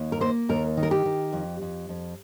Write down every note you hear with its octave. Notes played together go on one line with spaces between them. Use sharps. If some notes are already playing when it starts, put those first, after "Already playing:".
Already playing: D#2
A#4
A#3 C5
D#2 A#4
D#3
A#4
G4
D#3
F2
F2
F2